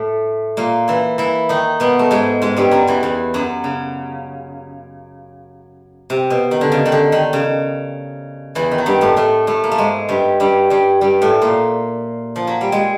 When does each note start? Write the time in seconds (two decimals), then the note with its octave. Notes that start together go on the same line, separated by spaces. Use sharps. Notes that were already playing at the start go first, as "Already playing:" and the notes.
Already playing: A2 A3
0.57 A#2 A#3
0.88 E3 E4
1.18 E3 E4
1.49 D#3 D#4
1.80 B2 B3
1.99 A3
2.11 G#2 G#3
2.42 G#2 G#3
2.57 G2 G3
2.71 F#2 F#3
2.87 E2 E3
3.03 E2 E3
3.34 F#2 F#3
3.64 C#3
6.10 C3
6.30 B2
6.51 D#3
6.61 D3
6.72 C#3
6.86 D#3
6.92 D3
7.12 D#3
7.33 C#3
8.55 E2 E3
8.71 D#3
8.78 F#3
8.86 G2 G3
9.01 A2 A3
9.17 A2 A3
9.47 A2 A3
9.64 A#3
9.71 A3
9.78 G#2 G#3
10.09 G2 G3
10.40 G2 G3
10.70 G2 G3
11.01 G2 G3
11.22 A2 A3
11.42 A#2 A#3
12.36 F3
12.47 F#3
12.61 G3
12.72 G#3